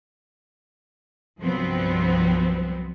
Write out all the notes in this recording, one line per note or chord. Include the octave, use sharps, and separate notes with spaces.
C2 G2 F3 F#3 B3 C4